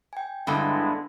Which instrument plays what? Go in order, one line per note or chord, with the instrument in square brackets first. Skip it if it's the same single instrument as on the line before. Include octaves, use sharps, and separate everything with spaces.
[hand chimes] G5 G#5
[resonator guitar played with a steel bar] G2 D3 [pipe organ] G#3 B3 E4